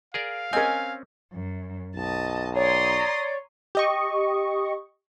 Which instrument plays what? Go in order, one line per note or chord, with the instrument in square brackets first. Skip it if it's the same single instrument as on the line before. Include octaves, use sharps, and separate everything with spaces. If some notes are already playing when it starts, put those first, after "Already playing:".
[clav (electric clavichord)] G#4 A#4 D5 [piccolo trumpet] F5
[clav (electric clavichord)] C4 C#4 [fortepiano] A#4 D#5 [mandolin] G#5
[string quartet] F#2
[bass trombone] B1 [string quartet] D#5 A5
[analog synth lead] C#5 [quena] D5 [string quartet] A#5 C6 D#6
[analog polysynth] G4 D#5 C#6